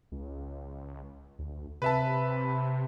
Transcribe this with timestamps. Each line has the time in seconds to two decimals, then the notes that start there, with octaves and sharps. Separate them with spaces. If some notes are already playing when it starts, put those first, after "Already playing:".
0.12 C#2
1.39 D2
1.82 C3 B4 E5 A5